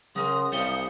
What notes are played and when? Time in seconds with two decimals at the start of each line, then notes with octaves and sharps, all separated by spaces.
0.16 C#3 F#3 A#4 C6 D#6
0.52 C2 G3 C#5 F5 G5